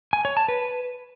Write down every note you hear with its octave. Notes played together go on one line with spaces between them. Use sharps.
G#5
C#5
A5
B4